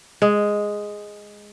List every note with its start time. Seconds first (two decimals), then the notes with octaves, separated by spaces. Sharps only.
0.22 G#3